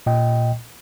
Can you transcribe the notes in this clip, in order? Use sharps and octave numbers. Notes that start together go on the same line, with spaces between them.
A#2 D#5 G5